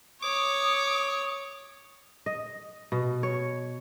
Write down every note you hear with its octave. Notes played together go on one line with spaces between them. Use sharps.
C#5 D6 D#6
D#5
B2
C#5